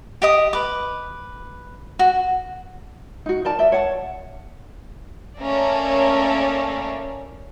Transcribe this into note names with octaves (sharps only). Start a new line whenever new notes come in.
G4 D#5 D#6
B4 D6
F#4
D#4 F#4
A#4 D5 A5
D5 E5
C#5 F#5 A5
A3 A#3 C#4 A4 A#4 D5